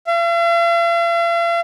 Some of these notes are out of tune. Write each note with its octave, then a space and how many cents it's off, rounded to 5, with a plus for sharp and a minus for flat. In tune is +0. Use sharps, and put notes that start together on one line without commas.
F5 -45